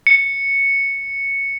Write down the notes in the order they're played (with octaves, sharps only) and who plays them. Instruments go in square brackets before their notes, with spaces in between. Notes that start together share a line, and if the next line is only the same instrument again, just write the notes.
[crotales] C#7